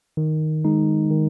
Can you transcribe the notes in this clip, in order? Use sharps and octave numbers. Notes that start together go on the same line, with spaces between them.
D#3
G#3 D#4
D#3